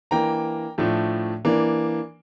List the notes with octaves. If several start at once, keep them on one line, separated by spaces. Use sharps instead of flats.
E3 A#3 D4 G5 A#5
A2 F3 A3 D4
E3 A#3 D4